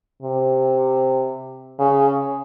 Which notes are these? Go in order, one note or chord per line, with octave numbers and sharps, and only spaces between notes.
C3
C#3